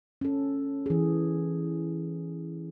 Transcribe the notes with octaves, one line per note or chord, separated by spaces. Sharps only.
C#4 A4
E3 G#4